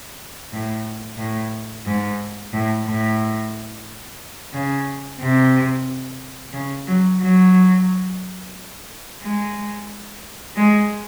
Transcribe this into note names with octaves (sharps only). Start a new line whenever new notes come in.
A2
A2
G#2
A2
A2
C#3
C3
C#3
F#3
F#3
G#3
G#3